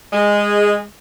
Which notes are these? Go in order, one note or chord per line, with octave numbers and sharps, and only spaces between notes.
G#3